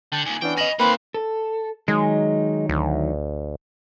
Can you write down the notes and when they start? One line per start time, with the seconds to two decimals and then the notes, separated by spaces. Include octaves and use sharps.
0.12 D3 G5 A5
0.26 D#2 A#2 G#5
0.42 E3 B3 C#4 D4 G5
0.58 D#5 G#5 B5 A#6
0.79 A#3 C4 D#4 B4 F5 B5
1.14 A4
1.88 D#3 F#3 G#3 D#4
2.69 D2